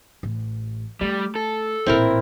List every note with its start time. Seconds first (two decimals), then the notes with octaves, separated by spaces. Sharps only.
0.23 A1
1.01 G3 A3
1.35 A4
1.86 A1 A#2 C4 E4 A#4